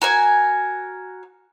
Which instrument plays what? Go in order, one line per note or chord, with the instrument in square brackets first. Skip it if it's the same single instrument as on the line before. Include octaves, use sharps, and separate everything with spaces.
[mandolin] F#4 A#4 G#5